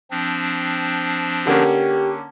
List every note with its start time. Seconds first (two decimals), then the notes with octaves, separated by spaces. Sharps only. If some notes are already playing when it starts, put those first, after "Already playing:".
0.11 F3 C4 D4
1.47 D3 A#3 C#4 G4